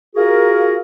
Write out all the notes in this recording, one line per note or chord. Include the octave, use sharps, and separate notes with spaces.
F4 F#4 G#4 A#4